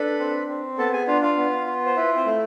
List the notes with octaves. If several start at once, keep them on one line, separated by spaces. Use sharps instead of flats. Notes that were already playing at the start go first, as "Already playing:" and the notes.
Already playing: D4 A4 B4 B5
C4
C4
B3 A4 A5
G#4 G#5
D4 F4 F5
F4 F5
B3
F4
C5
E4 B4
C4 C5
A3